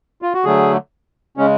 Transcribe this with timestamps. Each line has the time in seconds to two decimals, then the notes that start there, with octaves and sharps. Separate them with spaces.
0.22 F4
0.34 F#4
0.45 D3 F#3 A3 G#4
1.37 C#3 G#3 C#4